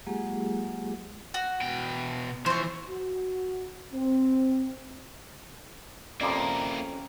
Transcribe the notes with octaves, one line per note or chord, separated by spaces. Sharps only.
F#3 G#3 A#3 F4 G4 G#4
F#4
B2 G5
E3 F3 C5 C#6
F#4
C4
F2 A#3 C#4 E4 G4 D5 A#5